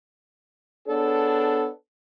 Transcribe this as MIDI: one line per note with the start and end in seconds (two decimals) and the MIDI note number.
0.88 1.68 59
0.88 1.68 62
0.88 1.68 68
0.88 1.68 69
0.88 1.68 73